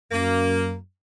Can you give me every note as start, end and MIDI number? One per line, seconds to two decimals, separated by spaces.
0.12 0.75 42
0.12 0.75 58